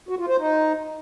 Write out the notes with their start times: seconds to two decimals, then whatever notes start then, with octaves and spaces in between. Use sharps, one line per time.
0.09 F#4
0.19 F4
0.28 C5
0.38 D#4